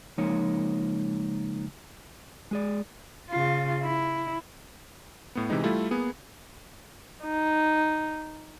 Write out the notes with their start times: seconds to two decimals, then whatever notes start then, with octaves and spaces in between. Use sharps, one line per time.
0.18 C#2 F3 G#3 A#3 D#4 C#5
2.51 G#3 G#4 D5
3.30 C#3 F4
3.83 E4
5.35 A2 B3
5.50 C3 E3 G#3 D#4
5.64 G3 A3 E4 F4
5.91 A#3 B3 G#4
7.24 D#4